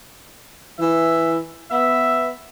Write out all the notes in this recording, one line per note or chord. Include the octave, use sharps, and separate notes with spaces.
E3 E5
B3 E5